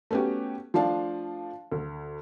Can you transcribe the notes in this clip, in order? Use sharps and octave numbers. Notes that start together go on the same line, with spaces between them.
A3 B3 C#4 F#4 G4
F3 A3 D4 F5 A5
D2